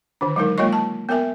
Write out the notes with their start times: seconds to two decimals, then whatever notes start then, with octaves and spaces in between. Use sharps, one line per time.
0.21 D3 D#3 D4
0.36 F#3 G#3 D#4 A#4
0.58 G#3 A#3 F4 C#5 D#5 C#6
0.73 A5
1.09 B3 A#4 E5 G#5